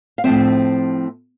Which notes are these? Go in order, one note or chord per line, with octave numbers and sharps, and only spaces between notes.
F5
A2 F3 C4 E5